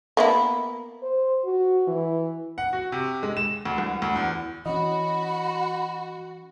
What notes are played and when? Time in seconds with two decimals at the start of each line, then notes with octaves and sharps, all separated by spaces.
0.17 A#3 B3 E4
1.03 C5
1.45 F#4
1.88 E3
2.58 F#5
2.73 F#4
2.92 C3
3.23 G#3
3.37 E7
3.65 D2
3.78 C2
4.02 D2
4.16 E2
4.66 E3 C#4 F#4 D#5 B5